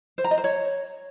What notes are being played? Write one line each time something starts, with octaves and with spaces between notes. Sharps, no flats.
C5
A#5
D#5
C5
C#5